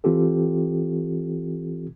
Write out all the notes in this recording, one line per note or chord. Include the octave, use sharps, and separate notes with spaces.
E3 C4 F4 G4 A4